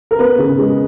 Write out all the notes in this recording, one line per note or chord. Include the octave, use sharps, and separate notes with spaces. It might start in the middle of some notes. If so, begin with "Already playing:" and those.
A#4
B3 B4
C#3
G#3